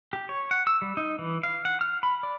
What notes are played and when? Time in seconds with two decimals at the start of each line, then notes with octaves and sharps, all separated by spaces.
0.13 G4
0.29 C#5
0.51 F#5
0.67 E6
0.82 G3
0.97 D#4
1.19 E3
1.43 F5
1.65 F#5
1.81 F6
2.03 B5
2.23 D5